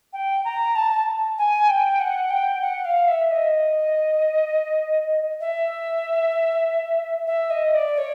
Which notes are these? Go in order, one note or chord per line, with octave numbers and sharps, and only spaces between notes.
G5
A#5
A5
G#5
G5
F#5
G5
F#5
F5
E5
D#5
E5
E5
D#5
D5
C#5